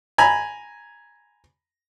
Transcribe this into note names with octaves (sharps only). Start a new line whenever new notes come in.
G#5 A#5 B5